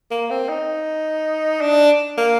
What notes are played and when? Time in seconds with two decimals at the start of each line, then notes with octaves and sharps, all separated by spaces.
0.11 A#3
0.30 C4
0.49 D#4
1.61 D4
2.18 A#3